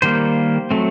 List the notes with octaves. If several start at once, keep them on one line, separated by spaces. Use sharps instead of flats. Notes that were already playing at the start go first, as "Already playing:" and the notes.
D#3 G3 A#3 C5
F#3 A3 C4